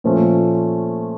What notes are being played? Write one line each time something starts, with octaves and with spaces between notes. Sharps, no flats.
A#2 F3 A3 C#4